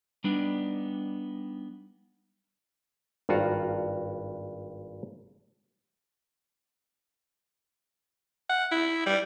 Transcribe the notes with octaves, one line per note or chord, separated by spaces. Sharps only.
G3 B3 D4 D#4
G#1 G2 F4 F#4 F#5 A#5
F#5
E4
G3